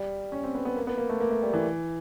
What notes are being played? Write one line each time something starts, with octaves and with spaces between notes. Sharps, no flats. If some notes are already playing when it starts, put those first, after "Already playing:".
Already playing: G3
C#4
C4
B3
B3
A#3
B3
A#3
A3
A#3
A3
G3
E3